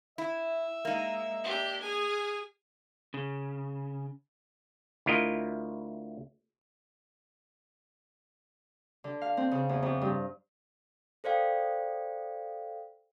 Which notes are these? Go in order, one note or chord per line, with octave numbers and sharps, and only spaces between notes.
E4 E5
G#3 A#3 D#4
D4 G4
G#4 G#5 F6
C#3
D2 E4 F4 A#4 D#5
D3
F5
C4
C#3
E2
F2
G2
A4 C5 D5 F5 G5